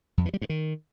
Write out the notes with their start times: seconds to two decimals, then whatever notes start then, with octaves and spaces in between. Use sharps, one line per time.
0.18 F2
0.26 E3
0.34 G3
0.41 G2
0.49 D#3